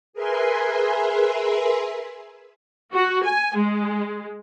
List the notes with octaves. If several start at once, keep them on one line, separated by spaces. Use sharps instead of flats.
G#4 A#4 B4 E5 G#5 C6
F#4
G#5
G#3